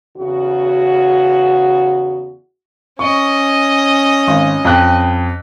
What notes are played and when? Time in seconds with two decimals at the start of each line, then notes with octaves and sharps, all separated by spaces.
0.17 E2 C#3 F#4
2.99 C#4 D#5 C#6
4.28 G#1
4.65 F2 G5 F#6